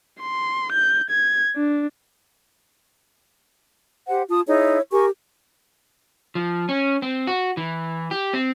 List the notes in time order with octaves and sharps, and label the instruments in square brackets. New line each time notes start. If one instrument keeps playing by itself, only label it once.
[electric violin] C6
G6
G#6
D4
[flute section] G4 C5 F#5
[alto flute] F4 [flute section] A5 D#6
[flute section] D#4 E4 G#4 [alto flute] C#5
[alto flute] G4 [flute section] A#4 G#5 C#6
[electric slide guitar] F3
C#4
C4
F#4
E3
G4
C4